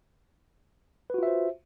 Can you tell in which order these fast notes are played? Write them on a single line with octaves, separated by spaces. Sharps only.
B4 F#4 F4 E5 C5